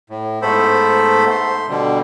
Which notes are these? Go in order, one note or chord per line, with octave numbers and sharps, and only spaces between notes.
A2
G#2 A3 B3 A4 C5 B5
C6
B2 D3 G3